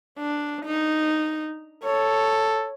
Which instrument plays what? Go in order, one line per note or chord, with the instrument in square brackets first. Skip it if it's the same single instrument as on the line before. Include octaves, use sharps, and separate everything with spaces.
[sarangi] D4
D#4
[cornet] A4 [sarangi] C#5